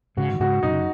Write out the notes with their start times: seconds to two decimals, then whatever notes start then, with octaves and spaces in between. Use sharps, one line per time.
0.17 G#2 C#3 F#4
0.33 D#3
0.40 G#2 C#3 F#4
0.63 F#2 B2 D#4
0.72 C#3